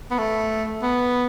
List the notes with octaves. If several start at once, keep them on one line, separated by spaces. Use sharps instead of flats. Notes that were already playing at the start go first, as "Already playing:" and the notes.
B3
A3
B3